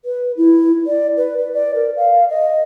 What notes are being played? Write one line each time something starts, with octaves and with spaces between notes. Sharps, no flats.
B4
E4
D5
B4
B4
D5
A#4
F5
D#5